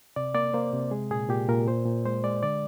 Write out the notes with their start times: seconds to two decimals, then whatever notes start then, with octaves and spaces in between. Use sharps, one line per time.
0.16 C3 D5
0.34 A#3 D5
0.54 A#3 C5
0.73 C3
0.91 G#3 G#4
1.11 A#2 G#4
1.29 A#2 G4
1.49 A#2 A#4
1.67 A#2 C5
1.86 A#2
2.05 G#3 C5
2.24 G#3 D5
2.43 D3 D5